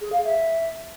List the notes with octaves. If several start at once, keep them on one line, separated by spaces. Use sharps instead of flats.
G#4
F5
E5